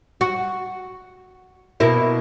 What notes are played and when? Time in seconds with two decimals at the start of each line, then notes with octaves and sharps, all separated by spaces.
0.21 F#4
1.80 B2 A#3 E4